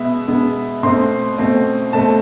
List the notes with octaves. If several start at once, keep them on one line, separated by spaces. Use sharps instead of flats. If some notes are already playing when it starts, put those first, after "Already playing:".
Already playing: B2 G#3 B3 E5
B2 G#3 B3
B2 A3 C4 C6
B2 A3 C4
B2 A3 C4 A5